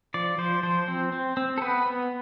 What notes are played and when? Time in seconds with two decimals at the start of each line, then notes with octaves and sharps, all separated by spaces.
0.14 F3 D5
0.38 F3 C5
0.63 F3 C5
0.88 C4
1.13 C4
1.37 C4
1.58 A4
1.62 B3 B4
1.86 B3